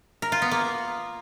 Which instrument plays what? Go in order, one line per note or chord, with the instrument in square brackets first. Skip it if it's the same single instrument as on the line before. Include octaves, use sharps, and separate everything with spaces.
[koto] A#4
F4
B3
A#3